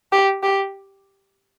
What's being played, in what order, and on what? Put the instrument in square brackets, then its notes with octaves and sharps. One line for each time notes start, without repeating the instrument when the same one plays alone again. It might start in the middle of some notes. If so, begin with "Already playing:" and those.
[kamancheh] G4
G4